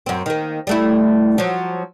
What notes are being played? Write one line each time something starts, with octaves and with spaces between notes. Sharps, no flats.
F#2 C4
D#3 A#3
G3 A3 E4
F3 F#3